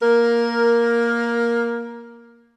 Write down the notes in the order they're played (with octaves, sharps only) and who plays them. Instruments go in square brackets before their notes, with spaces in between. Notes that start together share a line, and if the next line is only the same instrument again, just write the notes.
[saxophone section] A#3 A#4